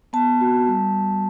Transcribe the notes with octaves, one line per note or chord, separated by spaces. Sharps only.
B3 A5
F#4
G3